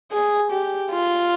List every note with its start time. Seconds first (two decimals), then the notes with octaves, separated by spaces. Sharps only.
0.12 G#4
0.51 G4
0.91 F4